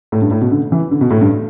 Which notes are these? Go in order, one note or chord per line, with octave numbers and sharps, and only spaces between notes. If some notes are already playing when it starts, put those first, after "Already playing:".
A2
G2
A2
B2
D3
E3
D3
B2
A2
G2